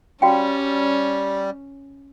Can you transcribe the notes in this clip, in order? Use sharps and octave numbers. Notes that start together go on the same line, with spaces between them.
G3 C#4 F#4 F5 G5